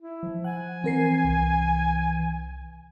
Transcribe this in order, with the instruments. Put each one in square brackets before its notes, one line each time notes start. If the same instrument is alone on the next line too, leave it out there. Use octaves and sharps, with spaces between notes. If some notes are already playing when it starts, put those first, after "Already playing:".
[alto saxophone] E4
[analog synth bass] F3
[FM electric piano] F#5 [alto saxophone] G#5
[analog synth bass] E3 [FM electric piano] C4 A#4 C7
[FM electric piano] C2